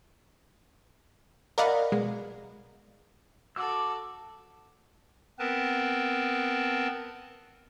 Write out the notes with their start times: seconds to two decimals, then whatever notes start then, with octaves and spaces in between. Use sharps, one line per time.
1.58 A#4 D5 D#5 F5 F#5 B5
1.92 B2 G#3
3.56 F#4 A4 D6 E6
5.39 B3 C4 A#4 B4 A5